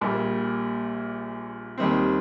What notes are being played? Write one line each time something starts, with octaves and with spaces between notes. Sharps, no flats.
A#1 A#2 G3 A#3
D#2 D#3 G3 C4